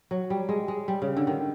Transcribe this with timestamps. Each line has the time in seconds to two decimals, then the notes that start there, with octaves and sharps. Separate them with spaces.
0.11 F#3
0.30 G3
0.49 G#3
0.68 G#3
0.88 G3
1.02 C#3
1.17 D3
1.27 D#3